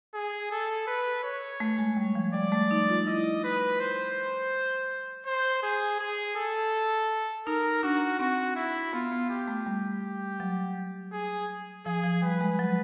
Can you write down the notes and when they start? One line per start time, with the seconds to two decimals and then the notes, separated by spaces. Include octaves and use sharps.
0.14 G#4
0.51 A4
0.87 B4
1.24 C#5
1.60 A3
1.78 G#3
1.97 G3
2.15 F3
2.34 G3 D5
2.52 A3
2.71 D#4
2.89 F4
3.07 E4 D#5
3.44 B4
3.81 C5
5.26 C5
5.63 G#4
5.99 G#4
6.36 A4
7.47 D#4 A#4
7.83 D4 F#4
8.19 C4 F#4
8.56 E4
8.93 B3 F4
9.12 B3
9.30 G4
9.47 A3
9.66 G3
10.40 F#3
11.12 G#4
11.86 F3 G#4
12.04 F3
12.22 G3 B4
12.41 G#3
12.59 F#3